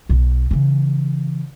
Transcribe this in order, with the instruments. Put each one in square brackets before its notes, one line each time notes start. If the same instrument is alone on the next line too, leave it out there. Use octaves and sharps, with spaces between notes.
[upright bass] B1 B2
C#3 E3